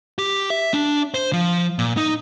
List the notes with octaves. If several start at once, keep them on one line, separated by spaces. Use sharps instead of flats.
G4
E5
D4
C5
F3
A#2
D#4